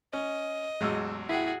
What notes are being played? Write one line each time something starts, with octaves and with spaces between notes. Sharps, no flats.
C#4 D#5
A1 E2 F#3 G#3 E6
E4 F#4 G#4 G5 B6